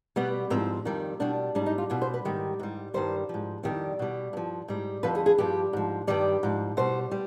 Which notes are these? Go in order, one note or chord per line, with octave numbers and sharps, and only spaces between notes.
B2 G3 B3
G#2 F3 C4
F2 D#3 G3
B2 G3 D4
G#2 G3 D4
D#4
F4
B2 G3 F4
C5
B4
G#2 D#3 G3
G#2 G3
G2 D#3 G3 C5
G#2 F3
F2 C3 D#3 G3 D5
B2 G3
G2 F3
G#2 G3
F2 D3 F3 B4
G#4
G#4
G2 F3 G4
G#2 F3
G2 D#3 G3 D5
G#2 F3
B2 G3 C5
G3